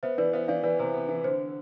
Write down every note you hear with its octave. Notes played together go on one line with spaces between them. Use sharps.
B3 C5 E5
E3 B4 D5
B3 C5 E5
E3 D5 F5
E3 B4 D5
C3 C5
B3
E3
D3 C5